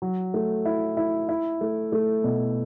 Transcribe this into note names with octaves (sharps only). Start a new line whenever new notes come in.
F#3
A3
E4
E4
E4
A3
A3
B2